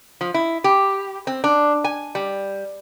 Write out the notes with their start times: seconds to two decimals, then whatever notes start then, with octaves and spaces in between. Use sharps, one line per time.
0.21 F3
0.34 E4
0.64 G4
1.27 C4
1.44 D4
1.84 G#5
2.15 G3